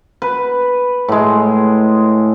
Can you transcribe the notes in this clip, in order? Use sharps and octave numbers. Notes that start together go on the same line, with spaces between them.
B4
A2 G#3